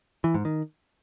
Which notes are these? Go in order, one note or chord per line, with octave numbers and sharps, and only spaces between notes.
E3
G#2
D#3